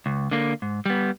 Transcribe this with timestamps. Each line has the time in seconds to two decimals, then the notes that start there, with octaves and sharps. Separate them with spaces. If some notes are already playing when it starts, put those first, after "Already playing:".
0.06 C#2
0.31 D3 A#3
0.62 G#2
0.86 G3 B3